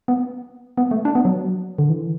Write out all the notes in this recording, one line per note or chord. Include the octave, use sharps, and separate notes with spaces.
B3
B3
A3
D4
B3
F#3
D3
E3